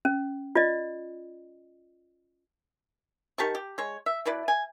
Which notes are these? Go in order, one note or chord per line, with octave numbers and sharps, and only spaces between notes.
C#4
F4 D5 D#5
D#3 G4 A5 C#6
G4
G#3 C#5
E5
B2 E4 B4 D5
G#5